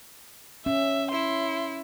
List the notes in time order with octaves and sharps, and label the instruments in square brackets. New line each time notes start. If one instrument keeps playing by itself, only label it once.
[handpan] C#4 [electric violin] E5
[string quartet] E4 [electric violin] C6